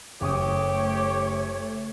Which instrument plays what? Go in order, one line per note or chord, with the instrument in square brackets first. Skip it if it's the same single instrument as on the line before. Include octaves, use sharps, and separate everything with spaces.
[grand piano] F#1 C#6 D#6 [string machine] A3 [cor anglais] G4 [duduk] C#5